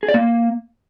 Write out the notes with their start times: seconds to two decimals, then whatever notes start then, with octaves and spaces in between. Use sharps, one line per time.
0.03 G#4
0.08 D5
0.14 A#3